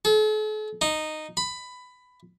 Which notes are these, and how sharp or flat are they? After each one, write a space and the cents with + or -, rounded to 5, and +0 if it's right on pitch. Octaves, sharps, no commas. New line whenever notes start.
A4 -45
D#4 -10
B5 +15